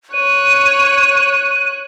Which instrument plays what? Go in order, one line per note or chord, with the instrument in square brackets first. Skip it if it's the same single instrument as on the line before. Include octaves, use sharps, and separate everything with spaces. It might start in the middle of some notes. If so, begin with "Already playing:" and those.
[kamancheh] C#5 F#6 [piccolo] D#7